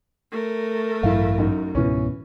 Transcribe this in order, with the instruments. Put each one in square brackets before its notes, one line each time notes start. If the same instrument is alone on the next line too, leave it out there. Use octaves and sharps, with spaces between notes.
[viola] A3 A#4
[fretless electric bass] A1 G2 F#3 [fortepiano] E4 F5
[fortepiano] F#2 D#4
[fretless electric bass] C#2 G#2 B2 [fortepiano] E3 C#4